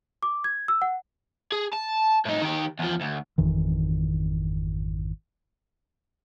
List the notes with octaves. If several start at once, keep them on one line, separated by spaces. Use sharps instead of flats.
D6
G#6
E6
F#5
G#4
A5
A2 D#4
D#3 G4
E2 F3
D2
G#1 F2 D#3 E3